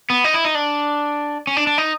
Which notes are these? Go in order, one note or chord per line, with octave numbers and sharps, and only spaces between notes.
B3
D#4
E4
D#4
D4
C#4
D4
D4
D#4